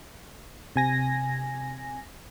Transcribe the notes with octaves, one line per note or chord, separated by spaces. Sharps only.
C3 G#5 A#6